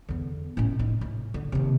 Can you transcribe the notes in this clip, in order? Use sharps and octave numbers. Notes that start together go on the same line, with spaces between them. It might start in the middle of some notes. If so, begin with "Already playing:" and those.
E2 D3
A2 C#4
D#4
A2
D3
D#2 C3